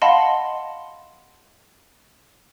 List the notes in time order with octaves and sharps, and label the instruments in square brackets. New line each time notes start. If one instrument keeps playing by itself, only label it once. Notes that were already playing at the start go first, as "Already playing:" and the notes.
[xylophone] D#5 F5 F#5 A5 B5 C6